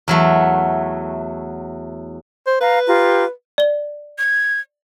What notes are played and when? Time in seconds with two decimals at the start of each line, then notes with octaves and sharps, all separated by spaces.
0.08 E2 F#3 A3
2.47 C5
2.61 B4 F5 A#5
2.86 F4 G4 A#5
3.58 D5 G7
4.18 G#6